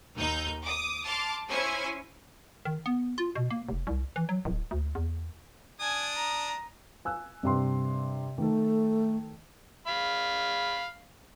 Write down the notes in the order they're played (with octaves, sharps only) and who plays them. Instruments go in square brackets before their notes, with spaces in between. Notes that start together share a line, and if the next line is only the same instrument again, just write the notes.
[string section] D#2 D#4 G6
D6 D#6
A5 C6 D6 F6
C#4 E4 C5 G#5 C#6
[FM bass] D#3
B3
F4
B2
A#3
F1
C2
E3
F#3
D1
D2
E2
[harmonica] D4 D#6 [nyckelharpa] G#5
[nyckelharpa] A#5
[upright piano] G#5 E6 F#6
G2 C3 C6
[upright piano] D#3 A4 [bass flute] A3
[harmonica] F5 B5